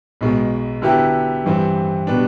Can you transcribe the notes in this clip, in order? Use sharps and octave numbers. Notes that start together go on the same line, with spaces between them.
B1 B2 G#3
D3 F#3 B3 E4 G4
G2 E3 G3 C4
B2 G3 B3 D4